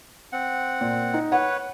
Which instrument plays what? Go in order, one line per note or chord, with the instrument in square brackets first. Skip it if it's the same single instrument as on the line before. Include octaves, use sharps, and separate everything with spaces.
[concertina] C4 F#5
[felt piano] A#2
D#4
[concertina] B4 C#5 [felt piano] F#5